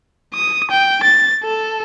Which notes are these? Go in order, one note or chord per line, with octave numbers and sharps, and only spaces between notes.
D#6
G5
A6
A4